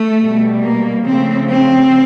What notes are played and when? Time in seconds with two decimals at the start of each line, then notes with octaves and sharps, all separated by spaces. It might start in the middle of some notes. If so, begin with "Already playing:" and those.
Already playing: A3
0.19 B2 G3
0.62 A#3
1.05 C#3 F3 A3 C4
1.48 C4